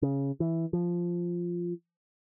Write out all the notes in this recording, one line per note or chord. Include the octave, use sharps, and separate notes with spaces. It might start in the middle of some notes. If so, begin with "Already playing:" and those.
C#3
E3
F3